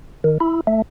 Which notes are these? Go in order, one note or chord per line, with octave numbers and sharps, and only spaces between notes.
D#3
E4
A3